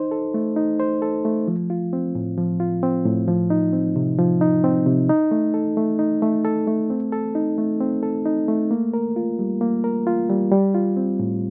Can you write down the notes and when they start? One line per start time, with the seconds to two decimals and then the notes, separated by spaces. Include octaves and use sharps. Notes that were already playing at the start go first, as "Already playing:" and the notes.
Already playing: D#4 C5
0.11 A4
0.34 A3
0.56 D#4
0.80 C5
1.02 A4
1.25 A3
1.47 F3
1.70 F4
1.93 C4
2.15 A2
2.38 F3
2.60 F4
2.83 C4
3.06 A2
3.28 F3
3.50 D#4
3.73 C4
3.96 C3
4.19 F3
4.41 D#4
4.64 C4
4.86 C3
5.09 D#4
5.31 A3
5.54 A4
5.77 A3
5.99 D#4
6.22 A3
6.45 A4
6.67 A3
6.90 C4
7.12 A4
7.35 D#4
7.58 A3
7.80 C4
8.03 A4
8.26 D#4
8.48 A3
8.71 A#3
8.94 A#4
9.16 F4
9.39 G3
9.61 A#3
9.84 A#4
10.07 F4
10.30 G3
10.52 G3
10.74 F4
10.97 C4
11.20 A2